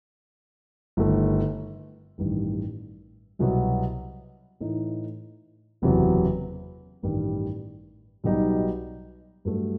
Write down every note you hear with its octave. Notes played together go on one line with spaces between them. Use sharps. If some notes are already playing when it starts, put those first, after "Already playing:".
G1 G2 D#3 A3
A1 G2 D#3
C2 B2 F#3 B3
A2 E3 A3 D#4
F#1 E2 C3 F#3
A1 G2 D#3 G3
B1 B2 G3 D#4
G2 F#3 A3